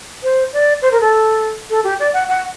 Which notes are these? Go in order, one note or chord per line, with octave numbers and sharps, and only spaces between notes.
C5
D5
C5
A#4
A4
A4
G4
D5
F#5
F#5